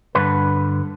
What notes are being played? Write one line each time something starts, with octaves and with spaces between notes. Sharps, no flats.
G2 D3 B4